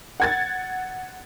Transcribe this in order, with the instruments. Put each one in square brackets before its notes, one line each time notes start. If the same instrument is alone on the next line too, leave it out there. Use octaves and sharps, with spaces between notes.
[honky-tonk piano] F#5 G#6 A6